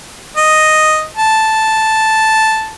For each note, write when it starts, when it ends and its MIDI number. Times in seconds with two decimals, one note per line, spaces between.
0.37 1.04 75
1.17 2.72 81